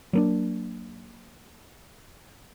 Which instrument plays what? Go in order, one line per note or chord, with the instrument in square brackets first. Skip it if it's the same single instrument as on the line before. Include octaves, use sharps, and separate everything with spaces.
[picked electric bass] F#3 A#3 D4